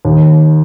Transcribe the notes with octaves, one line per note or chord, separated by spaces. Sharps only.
D#2